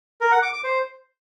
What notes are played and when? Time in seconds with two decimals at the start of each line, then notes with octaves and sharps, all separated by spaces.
0.21 A#4
0.32 F#5
0.42 D6
0.53 D6
0.64 C5